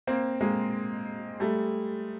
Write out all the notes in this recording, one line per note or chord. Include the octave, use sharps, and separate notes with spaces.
A#3 C4
G#3 A#3
G3 A3